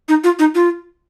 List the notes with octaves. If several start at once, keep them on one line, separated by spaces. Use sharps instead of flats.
D#4
F4
D#4
F4